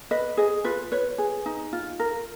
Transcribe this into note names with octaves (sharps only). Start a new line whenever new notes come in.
B4 D#5
G#4 D#5
F4 B4
B4 C#5
G#4
D#4
F4
A#4